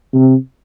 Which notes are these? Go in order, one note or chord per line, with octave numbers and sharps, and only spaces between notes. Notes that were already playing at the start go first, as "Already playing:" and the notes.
C3